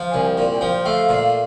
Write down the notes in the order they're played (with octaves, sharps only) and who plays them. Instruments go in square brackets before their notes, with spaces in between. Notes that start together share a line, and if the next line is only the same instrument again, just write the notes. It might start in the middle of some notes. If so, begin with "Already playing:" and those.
Already playing: [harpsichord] F3
[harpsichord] C2 [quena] G#5
[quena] G5
[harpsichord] A#2
[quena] G#5
[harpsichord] F3 [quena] G5
[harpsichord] A3 [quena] F5
[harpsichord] A#2